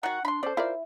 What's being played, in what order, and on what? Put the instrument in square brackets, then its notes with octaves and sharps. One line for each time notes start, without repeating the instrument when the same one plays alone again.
[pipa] D#3 F#4 [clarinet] F#5
[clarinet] D4 [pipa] B5 C6
[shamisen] C#4 A4 [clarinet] C5 [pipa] D5
[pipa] E4 [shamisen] F4 A#4 D5